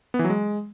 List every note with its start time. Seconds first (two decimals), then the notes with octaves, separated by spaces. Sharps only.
0.14 B3
0.19 E3
0.25 F#3
0.30 G#3